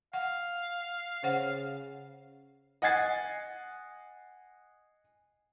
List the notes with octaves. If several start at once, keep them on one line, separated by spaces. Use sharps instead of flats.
F5 F#5
C#3 C5 F#5
D#5 F#5 G#5 G#6 A6 C7